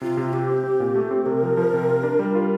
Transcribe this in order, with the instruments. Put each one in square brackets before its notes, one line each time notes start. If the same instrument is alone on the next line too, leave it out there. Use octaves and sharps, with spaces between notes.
[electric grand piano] C3 [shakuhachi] F4
[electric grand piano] C3
[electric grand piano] C4 [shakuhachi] G4
[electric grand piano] C4
C4
A#2
A3
C4
[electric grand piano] C3 [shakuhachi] A#4
[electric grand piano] F3
F3
C3
F4
D4
G3
F4